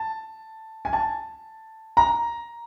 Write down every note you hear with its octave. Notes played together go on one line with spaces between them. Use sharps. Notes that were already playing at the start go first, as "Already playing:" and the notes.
Already playing: A5
G#5
A5
A#5